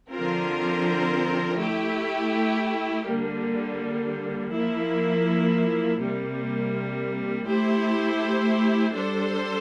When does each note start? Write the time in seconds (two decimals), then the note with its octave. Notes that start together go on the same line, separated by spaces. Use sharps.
0.12 D3 F3 C4 F4 A#4
1.58 A3 E4 G4
3.05 D3 G3 A#3
4.53 F3 A#3 E4
5.99 C3 G3 A#3
7.46 A3 E4 G4 C5
8.94 G3 D4 A4 C5